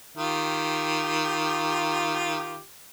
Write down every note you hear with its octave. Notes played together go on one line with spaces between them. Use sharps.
D#3 F4 G4